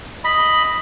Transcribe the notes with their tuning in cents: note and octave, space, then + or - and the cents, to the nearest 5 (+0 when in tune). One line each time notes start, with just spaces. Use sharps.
D#5 +0 B5 +0